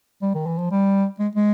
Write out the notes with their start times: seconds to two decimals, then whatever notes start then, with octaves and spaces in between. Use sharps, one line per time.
0.22 G3
0.35 D#3
0.46 E3
0.58 F3
0.72 G3
1.19 G#3
1.36 G#3